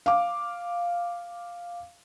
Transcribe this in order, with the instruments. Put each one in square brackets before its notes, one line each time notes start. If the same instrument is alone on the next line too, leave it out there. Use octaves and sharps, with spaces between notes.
[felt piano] F5 D6